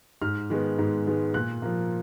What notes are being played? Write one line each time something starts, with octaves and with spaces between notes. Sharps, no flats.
G#2 F6
D#3 G#3 B3
G#2
D#3 G#3 B3
A#2 F#6
F3 A#3